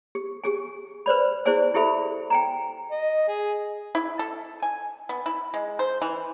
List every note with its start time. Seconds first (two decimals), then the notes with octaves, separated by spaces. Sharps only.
0.15 G4
0.44 G4 G#4 G#5
1.06 B4 C5 D5 B5
1.45 E4 G#4 C5 D5 G#5 E6
1.74 E4 G4 A4 E5 B5
2.30 G5 G#5 A#5
2.91 D#5
3.28 G#4
3.95 E4
4.19 A4
4.62 G#5
5.09 B3
5.26 E4
5.54 G#3
5.79 C5
6.02 E3